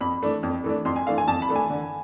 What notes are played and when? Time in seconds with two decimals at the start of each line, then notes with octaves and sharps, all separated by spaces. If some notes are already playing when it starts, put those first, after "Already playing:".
0.01 F2 B5
0.23 E3 A3 D4
0.43 F2
0.64 E3 A3 D4
0.85 F2 C6
0.96 G#5
1.07 E3 A3 D4 F5
1.18 G#5
1.28 F2 A5
1.42 B5
1.49 E3 A3 D4
1.56 G#5
1.70 D3